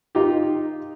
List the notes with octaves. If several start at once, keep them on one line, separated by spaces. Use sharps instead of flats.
D#4 F4 G4